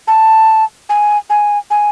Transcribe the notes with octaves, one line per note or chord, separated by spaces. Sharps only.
A5
G#5
G#5
G#5